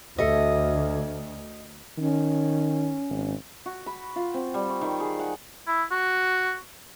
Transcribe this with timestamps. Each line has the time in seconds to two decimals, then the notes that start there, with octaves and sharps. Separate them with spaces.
0.19 D2 A4 D#5 E5
1.98 D#3 C#4
3.10 G#1
3.66 F#4
3.86 B5
4.16 F4
4.34 C4
4.54 G3
4.70 C#6
4.81 D#3
5.00 G#4
5.19 F#5
5.67 E4
5.91 F#4